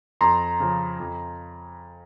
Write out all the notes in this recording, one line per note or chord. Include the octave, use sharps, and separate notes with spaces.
F2 A#5 C6
C#3 F3
F2